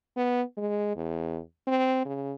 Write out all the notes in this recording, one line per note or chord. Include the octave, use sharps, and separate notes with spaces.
B3
G#3
E2
C4
C#3